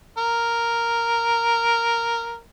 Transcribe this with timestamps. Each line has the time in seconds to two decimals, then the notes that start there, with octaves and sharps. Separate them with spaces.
0.18 A#4